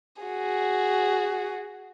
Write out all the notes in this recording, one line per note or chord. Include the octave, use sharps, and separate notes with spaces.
F#4 G#4